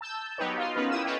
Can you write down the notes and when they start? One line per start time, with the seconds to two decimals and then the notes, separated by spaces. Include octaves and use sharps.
0.01 A5 E6 G6
0.38 F#3 B3 D#4 G4 B4 C#5
0.58 F4 D#5 F5 C6
0.75 B3 C#4 D#4 F4 A#4 B4
0.90 E4 G4 B4 G#5 D#6 E6
1.05 A4 B4 C#5 D#5 F5 G5